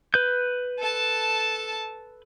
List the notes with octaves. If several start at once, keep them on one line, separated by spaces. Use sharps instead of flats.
B4 G6
A4 A5